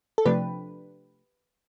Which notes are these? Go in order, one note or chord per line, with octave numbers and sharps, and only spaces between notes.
A4
C3 F3 A3 D4 G4 B4